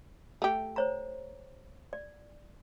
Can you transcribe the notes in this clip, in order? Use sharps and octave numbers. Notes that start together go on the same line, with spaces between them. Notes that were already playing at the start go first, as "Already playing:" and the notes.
A3 G4
C5 C#5 A#5
D5